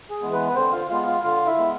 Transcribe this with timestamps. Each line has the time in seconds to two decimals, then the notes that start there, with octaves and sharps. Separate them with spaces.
0.10 G#4
0.22 E3 G#3 B3
0.33 B3 B4
0.50 B4
0.55 D3 C4 C5
0.72 F4 F5
0.90 G#3 B3 F4 F5
1.07 F4 F5
1.24 D3 F4 F5
1.46 E4 E5
1.58 G#3 B3